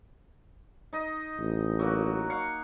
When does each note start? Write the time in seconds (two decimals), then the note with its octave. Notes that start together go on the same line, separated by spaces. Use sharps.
0.93 D#4 D#5
1.40 A1
1.79 F#3 A#3 F#4
2.30 F5 F#5 C#6